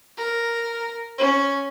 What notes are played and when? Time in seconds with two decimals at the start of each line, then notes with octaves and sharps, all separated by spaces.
0.17 A#4
1.18 C#4